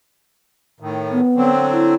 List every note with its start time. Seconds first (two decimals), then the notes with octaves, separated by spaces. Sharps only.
0.80 A2 D#3
1.11 B3
1.35 D3 F#3 C4
1.72 E4